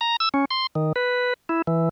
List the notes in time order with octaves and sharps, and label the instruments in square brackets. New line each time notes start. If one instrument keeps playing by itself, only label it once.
[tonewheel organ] A#5
E6
C#4
C6
D#3
B4
E4
E3